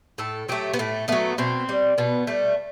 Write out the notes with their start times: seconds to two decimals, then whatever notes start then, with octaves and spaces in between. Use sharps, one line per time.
0.18 A2 A4
0.49 F#3 A3 G4
0.74 B3
0.79 A2 A3
1.08 F#3 A3 B3
1.38 B2 C4
1.69 G3
1.98 B2 B3
2.27 G3 A3